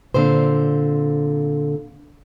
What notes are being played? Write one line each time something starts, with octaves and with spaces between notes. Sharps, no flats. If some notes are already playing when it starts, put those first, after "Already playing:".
A#2 D3 C4 C5